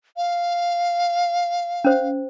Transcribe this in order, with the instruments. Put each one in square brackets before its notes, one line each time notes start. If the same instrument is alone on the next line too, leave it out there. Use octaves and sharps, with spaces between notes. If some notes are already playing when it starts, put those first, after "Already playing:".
[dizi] F5
[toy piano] C#4 C5